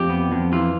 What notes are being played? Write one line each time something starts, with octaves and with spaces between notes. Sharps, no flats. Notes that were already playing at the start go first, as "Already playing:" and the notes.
Already playing: F2 G4
B3
F2
E3 F4